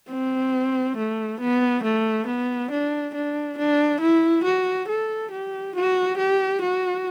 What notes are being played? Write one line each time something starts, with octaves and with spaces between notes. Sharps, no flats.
C4
A3
B3
A3
B3
D4
D4
D4
E4
F#4
A4
G4
F#4
G4
F#4